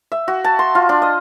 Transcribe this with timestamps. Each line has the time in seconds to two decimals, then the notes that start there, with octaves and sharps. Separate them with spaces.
0.12 E5
0.28 F#4
0.44 A5
0.59 C6
0.75 F4
0.89 D4
1.02 D#5